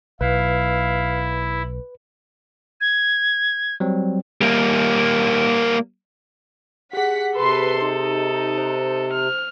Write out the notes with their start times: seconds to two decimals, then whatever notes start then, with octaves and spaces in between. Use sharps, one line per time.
0.21 B1 E4 B4 F5
2.81 G#6
3.80 F#3 G3 C4
4.41 G3 A#3
6.93 G4 G#4 F#5 B6
7.37 C3 A4 B4 C6
7.82 D#4
8.58 C5
9.13 F6